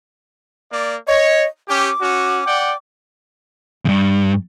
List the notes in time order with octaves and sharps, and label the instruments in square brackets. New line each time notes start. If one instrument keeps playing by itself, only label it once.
[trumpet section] A#3 D5
[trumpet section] C#5 [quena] D#5
[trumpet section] C#4 G4 [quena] D6
[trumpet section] C#4 F#4
D5 F#5 G5
[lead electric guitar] E2 G2